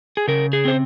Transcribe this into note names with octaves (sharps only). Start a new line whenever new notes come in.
G#4
C#3 A#4
G#4
C4 C5